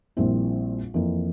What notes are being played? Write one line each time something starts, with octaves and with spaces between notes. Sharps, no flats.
A#1 A#2 G3 C4 E4
F2 E3 A#3